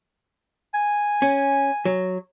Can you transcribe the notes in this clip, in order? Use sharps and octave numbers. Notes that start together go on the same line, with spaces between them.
G#5
C#4
F#3